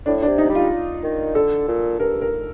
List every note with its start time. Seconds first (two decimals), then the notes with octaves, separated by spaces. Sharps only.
0.06 A2 D4
0.22 D4
0.28 C3
0.38 D#4
0.49 G3
0.55 F4
1.03 D#3
1.35 D3 A4
1.68 A#2
1.99 G2 A#4
2.21 A#4